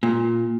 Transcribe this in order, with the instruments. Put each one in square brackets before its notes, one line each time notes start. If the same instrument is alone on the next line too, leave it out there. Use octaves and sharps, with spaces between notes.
[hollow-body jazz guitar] A#2